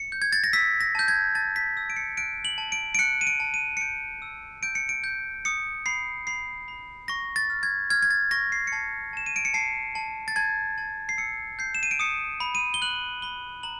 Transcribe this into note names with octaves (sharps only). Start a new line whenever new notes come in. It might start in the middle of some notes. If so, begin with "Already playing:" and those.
Already playing: C#7
G6
G#6
A6
A#6
E6 B6
A#6
A5 G6
G#6
A5 A6
B6
E6
D7
C#7
F#6 D7
F#7
A5
D7
D7
F#6 C#7
D#7
D7
A5
D#7
C#7
G6 D7
E6
G6 D7
C#7
D7
G6
D#6 C#7
B5 C7
B5 C7
B5
C#6 A#6
A6
F6
G#6
F6 G#6
G#6
A6
C#6 A#6
C7
C#7
A5 C7
A5 E7
D#7
D7
C#7
A5 C7
A5
A6
A5 G#6
A5
C7
E6 C#7
G6 C7
E7
D#7
D7
D#6 C#7
B5
D#7
G7
F#6 F#7
B5 G7
A#5 F#7